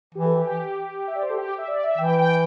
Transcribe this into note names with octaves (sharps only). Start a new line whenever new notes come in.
E3 G4
A4
G4
E5
D5
C5
A4
G4
E5
D5
E5
E3 G5
G5